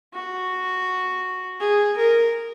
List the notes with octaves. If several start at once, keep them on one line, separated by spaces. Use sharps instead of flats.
F#4
G#4
A#4